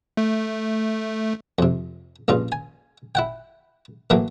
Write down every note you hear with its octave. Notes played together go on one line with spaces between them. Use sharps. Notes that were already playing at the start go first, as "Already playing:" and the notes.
A3
F2 C3
A#1 G2 C#3 F4
G#5
E4 F#5 G5
A2 E3 F#3 A3 A#3